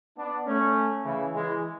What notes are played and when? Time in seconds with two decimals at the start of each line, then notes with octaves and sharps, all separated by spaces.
0.17 B3 D4
0.46 A3 C#4
1.04 C#3 E3
1.34 E3 G#3